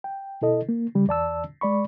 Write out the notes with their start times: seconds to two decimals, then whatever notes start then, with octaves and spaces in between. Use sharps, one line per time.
0.04 G5
0.42 B2 E4 A4 D#5
0.69 A#3
0.95 C#3 G3
1.08 E2 D5 A5 E6
1.61 G#3 D5 B5 C#6